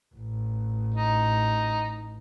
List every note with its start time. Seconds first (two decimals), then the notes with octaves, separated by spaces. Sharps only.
0.15 A1
0.94 D#4